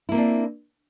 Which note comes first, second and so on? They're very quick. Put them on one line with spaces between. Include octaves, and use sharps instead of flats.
E4 A#3 C4 D4